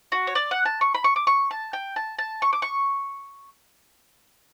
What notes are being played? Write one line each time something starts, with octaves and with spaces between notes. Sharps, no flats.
F#4
C#5
D5
F#5
A5
C#6
B5
C#6
D6
C#6
A5
G5
A5
A5
C#6
D6
C#6